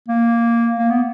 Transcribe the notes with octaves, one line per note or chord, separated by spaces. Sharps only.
A#3
A#3
B3